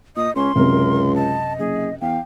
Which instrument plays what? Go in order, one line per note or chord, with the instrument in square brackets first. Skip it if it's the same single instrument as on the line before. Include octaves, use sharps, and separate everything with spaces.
[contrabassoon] A#2 [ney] D#5 [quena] D#6
[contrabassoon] C#2 [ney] C#4 [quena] C6
[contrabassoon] C#2 [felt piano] F#2 C3 [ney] A#4
[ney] D#5 [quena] A5
[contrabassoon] F#1 [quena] G#4
[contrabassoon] E2 [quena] F5 [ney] G5